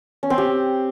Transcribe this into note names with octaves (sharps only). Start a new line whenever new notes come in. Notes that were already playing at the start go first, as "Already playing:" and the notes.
C#4
C4
G4